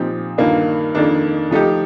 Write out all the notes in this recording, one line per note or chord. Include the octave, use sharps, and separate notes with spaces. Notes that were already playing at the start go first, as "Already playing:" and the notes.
Already playing: A#2 F3 C4 D#4 G4
G2 D#3 A#3 F4
F2 D#3 A#3 D4
F3 A3 D#4 G4